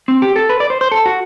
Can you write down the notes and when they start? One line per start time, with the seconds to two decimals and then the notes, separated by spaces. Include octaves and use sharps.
0.08 C4
0.22 G4
0.36 A4
0.50 B4
0.60 D5
0.70 C5
0.81 C5
0.92 A4
1.06 F#4